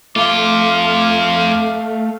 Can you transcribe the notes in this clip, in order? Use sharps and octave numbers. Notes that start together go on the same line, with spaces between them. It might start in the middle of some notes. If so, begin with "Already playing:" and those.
F2 A3 F4 F5 D6